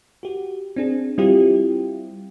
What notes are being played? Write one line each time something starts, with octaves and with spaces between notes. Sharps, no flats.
F#4 G4
C4 D4 G#4
G3 C4 E4 F4 G4